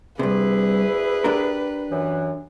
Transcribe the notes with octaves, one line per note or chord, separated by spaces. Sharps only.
D2 G2 C3 E4 G#4 B4
D4 G4 A#4
F#2 E3